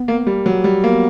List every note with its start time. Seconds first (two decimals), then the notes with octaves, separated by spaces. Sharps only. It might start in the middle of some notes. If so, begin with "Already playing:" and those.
Already playing: B3
0.08 A#3
0.27 G3
0.46 F#3
0.64 G3
0.84 A#3 B3